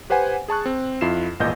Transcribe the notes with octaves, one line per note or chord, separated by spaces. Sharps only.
G4 B4 C5 F#5 G#5
G#4 A5 C#6 F#6
C4
F2 E4 F4 C7 E7
G#1 E2 A#2 D#5 G6 A#6